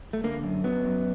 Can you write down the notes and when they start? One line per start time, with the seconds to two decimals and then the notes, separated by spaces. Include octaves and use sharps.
0.13 A3
0.24 D3 A#3
0.44 F#2
0.64 F#3 B3
0.85 F#2